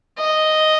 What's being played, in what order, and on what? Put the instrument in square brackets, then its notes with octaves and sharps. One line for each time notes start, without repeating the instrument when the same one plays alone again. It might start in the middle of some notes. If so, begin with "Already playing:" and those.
[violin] D#5